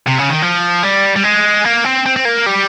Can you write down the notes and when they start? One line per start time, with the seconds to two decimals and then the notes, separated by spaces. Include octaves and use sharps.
0.07 C3
0.19 C#3
0.30 D#3
0.42 F3
0.83 G3
1.16 G3
1.24 G#3
1.65 A#3
1.85 C4
2.06 C4
2.16 C4
2.25 A#3
2.46 G3